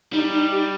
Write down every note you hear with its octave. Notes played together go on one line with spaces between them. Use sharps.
G3 D#4
D#4
G4